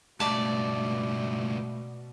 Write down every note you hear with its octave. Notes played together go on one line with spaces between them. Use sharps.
C#2 G2 B2 A3 D5 A5